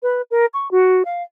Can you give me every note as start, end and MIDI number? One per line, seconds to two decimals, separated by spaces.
0.03 0.22 71
0.31 0.46 70
0.54 0.70 85
0.71 1.03 66
1.05 1.23 77